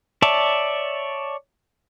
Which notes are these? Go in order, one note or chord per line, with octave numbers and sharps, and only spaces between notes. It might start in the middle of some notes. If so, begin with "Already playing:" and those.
C#5 D5 E5 A5